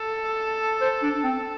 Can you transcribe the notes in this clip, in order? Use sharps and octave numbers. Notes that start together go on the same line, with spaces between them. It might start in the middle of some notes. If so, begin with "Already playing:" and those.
Already playing: A4
C5
D4
C4